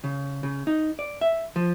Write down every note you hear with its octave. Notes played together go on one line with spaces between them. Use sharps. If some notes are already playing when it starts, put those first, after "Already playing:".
C#3
C#3
D#4
D5
E5
F3